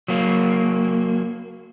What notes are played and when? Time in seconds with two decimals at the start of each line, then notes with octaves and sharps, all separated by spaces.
0.08 F#3 A#3